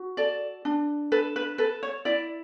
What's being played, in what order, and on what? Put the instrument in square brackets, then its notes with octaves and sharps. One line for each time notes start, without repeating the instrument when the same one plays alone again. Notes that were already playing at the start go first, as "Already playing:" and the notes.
Already playing: [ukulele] F#4
A4 D5
D4
A4 B4
B4
A4 B4
C#5
E4 D5